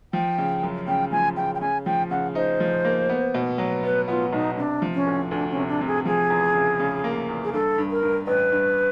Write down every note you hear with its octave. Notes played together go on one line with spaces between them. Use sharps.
F3 G5
C#3
F#2
C#3 G5
F3 G#5
C#3 G5
G5
C#3 G#5
F3 G5
C#3 F#5
D#4 C5
F3
A#3
B3
B2
F#3
B3 B4
B3 F4
B1 D#4
C3 D4
F3
C#4
D2
D2 D4
C#4
C3
D4
C3
G#4
F3 G#4
E2
C#3
C#3
A#3
E2
G#4
G2 A4
G2
A#4
G2
A1 B4
G2